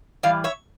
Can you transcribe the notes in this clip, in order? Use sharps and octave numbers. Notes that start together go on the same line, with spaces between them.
A2 E3 G3 D5 F5
C#5 E5